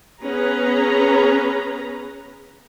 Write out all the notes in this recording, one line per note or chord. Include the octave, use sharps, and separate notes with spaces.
B3 C#4 G#4 B4 A#5